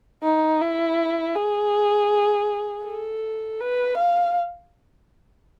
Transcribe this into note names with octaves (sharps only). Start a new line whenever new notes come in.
D#4
E4
G#4
A4
B4
F5